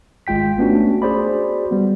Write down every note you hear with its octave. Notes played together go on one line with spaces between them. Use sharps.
G#1 G#3 F4 G5 B6
A3 B3 C#4 D4 F#4
F#4 G#4 C5 D5 B5
G3 B3